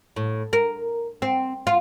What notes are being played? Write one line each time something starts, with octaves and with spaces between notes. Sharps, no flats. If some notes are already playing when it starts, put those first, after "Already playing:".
A2
A#4
C4
F4